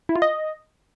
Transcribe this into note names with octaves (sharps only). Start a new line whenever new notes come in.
E4
F4
D#5